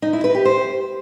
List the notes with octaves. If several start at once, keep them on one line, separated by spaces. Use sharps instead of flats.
D#4
E4
B4
G4
C5